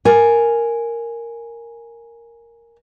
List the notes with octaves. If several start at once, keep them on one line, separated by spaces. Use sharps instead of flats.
A#4 G#5